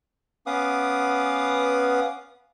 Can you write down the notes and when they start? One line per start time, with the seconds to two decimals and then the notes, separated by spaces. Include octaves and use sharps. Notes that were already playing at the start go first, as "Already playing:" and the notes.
0.46 B3 C#4 B4 F5 D6 D#6